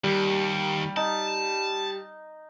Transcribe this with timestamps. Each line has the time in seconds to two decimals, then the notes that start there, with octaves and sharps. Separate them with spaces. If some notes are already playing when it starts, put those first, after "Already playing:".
0.04 D#2 G3
0.97 D#4 A5